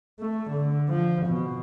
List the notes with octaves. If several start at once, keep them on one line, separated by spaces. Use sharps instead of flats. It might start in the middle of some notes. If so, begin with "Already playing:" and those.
A3
D3
F3
B2